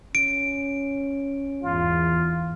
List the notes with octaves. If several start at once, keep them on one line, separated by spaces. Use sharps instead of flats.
C#4 D7
E2 G#2 F4